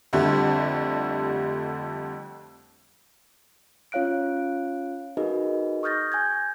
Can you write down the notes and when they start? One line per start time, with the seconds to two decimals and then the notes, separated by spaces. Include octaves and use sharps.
0.13 F2 D3 G3 A3
3.92 C#4 F4 C#5 F5 F#6 D7
5.17 D#4 F#4 G#4 A#4 B4 D#5
5.83 C#6 D#6 F6 G6 A6 A#6
6.12 G#5 G6 G#6